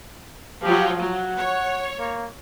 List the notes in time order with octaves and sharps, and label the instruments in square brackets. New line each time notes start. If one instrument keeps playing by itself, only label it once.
[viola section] F3 F#3 F4 [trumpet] G4
[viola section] F#3 [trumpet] F#5
[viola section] C#5
[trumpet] A#3